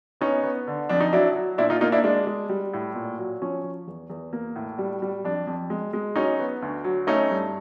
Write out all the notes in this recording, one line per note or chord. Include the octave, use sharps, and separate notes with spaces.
B3 C#4 D#4
B3
D3
F2 D4
D#4
F#3 D4 E4
F#3
A#2 D4 E4
D#4 F4
A#3 D#4 F4
D4 E4
G#3 D4
G#3
G3
A2
A#2
F#3
F3 C#4
F3
E2
E2
A#3
A2
G3
G3
F2 D4
F2
G#3
G#3
F#3 C#4 D#4
B3
D2
F#3
A3 C#4 D#4
G2